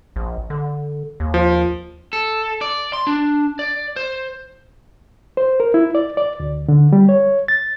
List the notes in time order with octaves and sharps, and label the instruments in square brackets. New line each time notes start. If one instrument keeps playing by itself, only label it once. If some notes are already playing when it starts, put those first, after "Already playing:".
[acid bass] A#1
D3
D#2
[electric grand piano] F3
[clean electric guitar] A4
D5
C6
D4
D5
C5
[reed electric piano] C5
A#4
E4
D5
D5
D2
D3
G3
C#5
A6